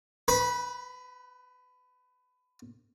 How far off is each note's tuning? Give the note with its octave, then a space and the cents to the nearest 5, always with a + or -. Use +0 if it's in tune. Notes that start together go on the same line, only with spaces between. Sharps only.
B4 +25 B5 -20